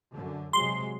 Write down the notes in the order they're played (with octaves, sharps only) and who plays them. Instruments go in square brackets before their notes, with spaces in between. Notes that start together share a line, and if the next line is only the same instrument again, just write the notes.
[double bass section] F#2 D3
[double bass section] C3 F#3 G#3 [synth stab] C6